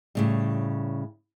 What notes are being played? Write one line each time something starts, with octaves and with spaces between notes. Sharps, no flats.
A2 C#3 G3